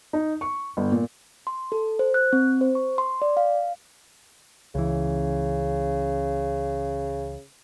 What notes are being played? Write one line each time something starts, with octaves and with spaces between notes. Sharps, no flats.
D#4
C#6
G1
A#2
C6
A4
C5
F#6
C4
C5
C#6
C6
D5
F5
C#2 C#3 E3